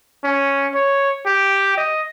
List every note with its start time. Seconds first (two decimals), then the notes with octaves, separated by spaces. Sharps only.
0.24 C#4
0.74 C#5
1.26 G4
1.77 D#5